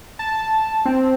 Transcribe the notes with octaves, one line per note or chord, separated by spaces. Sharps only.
A5
C4